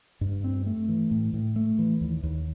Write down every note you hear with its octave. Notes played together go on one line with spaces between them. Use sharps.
G2
C4
A3
E3
A2
A2
A3
E3
D#2
D#2